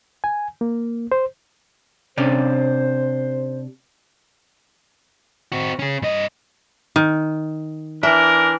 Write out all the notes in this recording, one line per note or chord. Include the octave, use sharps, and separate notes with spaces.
G#5
A#3
C5
C3 C#4 D4 C5
C4 F#4
C#4 G#4
G2 D#5
D#3
E3 D4 A#4 E5